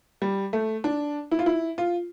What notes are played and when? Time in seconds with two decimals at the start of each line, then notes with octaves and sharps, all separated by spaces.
0.22 G3
0.53 A3
0.84 D4
1.31 E4
1.39 F4
1.46 E4
1.78 F4